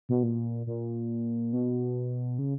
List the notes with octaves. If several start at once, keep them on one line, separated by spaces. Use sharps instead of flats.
B2
A#2
A#2
B2
C#3